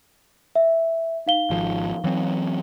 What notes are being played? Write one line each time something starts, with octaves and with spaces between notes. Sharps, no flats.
E5
D#4 F5 G7
G#1 F3
E3 F#3 C4